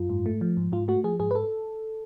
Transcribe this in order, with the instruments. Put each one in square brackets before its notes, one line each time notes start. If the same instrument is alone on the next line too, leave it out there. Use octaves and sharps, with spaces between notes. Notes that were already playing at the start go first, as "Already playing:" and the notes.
Already playing: [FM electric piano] F#2 F4
G#2
A3
F3
G#2
G#2 F4
A3 F#4
F3 G#4
G#2 G#4
B4
A4